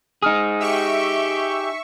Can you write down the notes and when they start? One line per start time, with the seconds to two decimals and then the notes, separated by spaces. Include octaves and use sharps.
0.22 D#4 G#4 D#6 F6
0.60 G4 E5 C#6